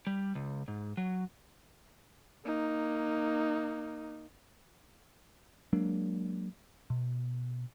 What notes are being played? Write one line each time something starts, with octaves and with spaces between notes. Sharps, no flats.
G3
C#2
G#2
F#3
A#3 D#4
F#3 G#3 A#3 D4
B2